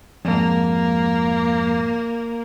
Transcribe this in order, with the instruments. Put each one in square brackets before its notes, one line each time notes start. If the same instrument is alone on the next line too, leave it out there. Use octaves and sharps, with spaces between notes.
[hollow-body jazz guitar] F2 G#2 [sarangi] A#3